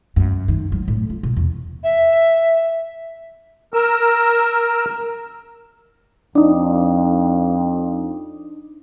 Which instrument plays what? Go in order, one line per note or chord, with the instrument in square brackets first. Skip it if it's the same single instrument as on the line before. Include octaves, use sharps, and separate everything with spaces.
[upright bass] F#2
D#3
F#3
A2
F4
B2
E2
[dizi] E5
[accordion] A#4 E6
[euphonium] F2 [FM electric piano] D4 D#4